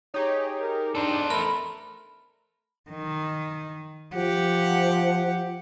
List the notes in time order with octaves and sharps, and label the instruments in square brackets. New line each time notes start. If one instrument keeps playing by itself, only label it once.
[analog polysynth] D#4 G4 G#4 [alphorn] C#5
[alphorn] A#4
[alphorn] D4 [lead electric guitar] A4 C5
[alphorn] A3 [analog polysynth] A#4 [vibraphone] B5
[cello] D#3
[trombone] F3 [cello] G4 F#5